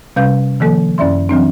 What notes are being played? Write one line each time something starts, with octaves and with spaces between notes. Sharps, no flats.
C3 G3 C#4 B4 F5 G6
D#3 F3 A#3 A4
F#2 C#4 D5 E5 C6
E3 F#3 C4 D4